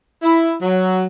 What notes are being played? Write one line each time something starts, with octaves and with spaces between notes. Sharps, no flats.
E4
F#3